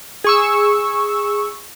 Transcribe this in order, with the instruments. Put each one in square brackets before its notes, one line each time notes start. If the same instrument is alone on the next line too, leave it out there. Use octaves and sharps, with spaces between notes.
[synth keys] G#4 C#6 E6